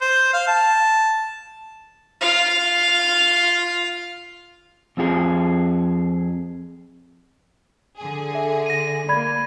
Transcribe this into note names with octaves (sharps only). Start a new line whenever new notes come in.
C5
F5
A5
F4 F5
F2 C4 F4 G#4
D3 G#4
A4 E5
A#6 D#7
A#3 D5 B5 G#6